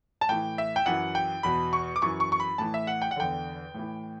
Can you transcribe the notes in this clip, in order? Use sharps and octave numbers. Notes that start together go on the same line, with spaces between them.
A5
A2 E3 G5
E5
G5
F#2 E3 F#5
G5
E2 B2 B5
C#6
D6
F#2 E3 C#6
C#6
C#6
B5
A2 E3 A5
E5
F#5
G5
F#5
E2 D3 G5
A2 E3